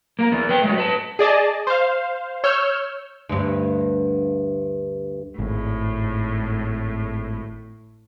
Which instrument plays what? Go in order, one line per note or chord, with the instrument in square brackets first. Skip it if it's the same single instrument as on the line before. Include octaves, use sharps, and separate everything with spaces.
[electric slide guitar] A#3 A#4
E3 B3
B4 G5
F#3 G#3 A3
B4 A5
[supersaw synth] G#4 D5 D#5 A5
C5 F5
C#5 E6 F6 G6
[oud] D2 G2
[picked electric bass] G#1 [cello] A2